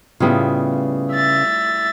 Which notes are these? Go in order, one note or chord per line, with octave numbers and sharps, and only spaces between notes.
A2 C#3 G3 B3 F4
E5 A6